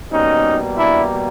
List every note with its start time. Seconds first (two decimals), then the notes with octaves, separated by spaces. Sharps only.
0.11 B2 G3 A#3 C#4 D#4
0.78 D4 E4